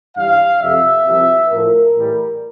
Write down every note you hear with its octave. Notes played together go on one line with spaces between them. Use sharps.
G2 E3 G3 F5
F2 C3 F3 E5
C2 C3 F3
A2 F3 A#4
A2 E3 G3